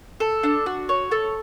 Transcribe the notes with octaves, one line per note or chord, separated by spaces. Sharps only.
A4
D4
F#4
C#5
A4